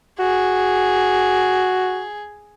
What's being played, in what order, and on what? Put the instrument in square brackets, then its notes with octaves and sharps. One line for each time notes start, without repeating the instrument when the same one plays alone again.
[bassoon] F#4 [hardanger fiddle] G#4